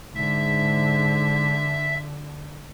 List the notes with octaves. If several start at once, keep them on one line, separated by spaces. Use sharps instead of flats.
G#2 D3 E5